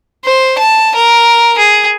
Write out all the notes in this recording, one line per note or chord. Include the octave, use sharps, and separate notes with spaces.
C5
A5
A#4
G#4